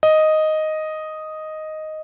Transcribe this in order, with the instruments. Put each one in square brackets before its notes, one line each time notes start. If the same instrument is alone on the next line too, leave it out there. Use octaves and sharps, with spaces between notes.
[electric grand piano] D#5